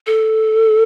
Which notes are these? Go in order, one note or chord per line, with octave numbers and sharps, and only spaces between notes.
A4